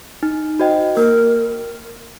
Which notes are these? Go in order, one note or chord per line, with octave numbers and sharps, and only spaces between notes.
D#4
F#4 C5 D#5 G5
A#3 A#4